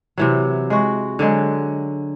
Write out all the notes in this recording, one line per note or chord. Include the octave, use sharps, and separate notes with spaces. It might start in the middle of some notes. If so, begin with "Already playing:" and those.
C3 E3 F#3
G#3 F#4
D3 F#3 G#3